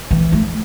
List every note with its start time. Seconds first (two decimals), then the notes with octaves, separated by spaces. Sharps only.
0.11 E3
0.32 A3